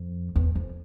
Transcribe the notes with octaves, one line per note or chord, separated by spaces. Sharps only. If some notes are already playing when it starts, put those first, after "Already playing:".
Already playing: F2
E2
F2